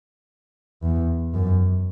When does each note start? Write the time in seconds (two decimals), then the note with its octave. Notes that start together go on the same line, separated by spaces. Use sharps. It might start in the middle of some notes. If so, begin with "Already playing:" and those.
0.83 E2
1.34 F#2